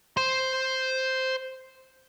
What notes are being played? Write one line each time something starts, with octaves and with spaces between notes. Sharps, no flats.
C5 C6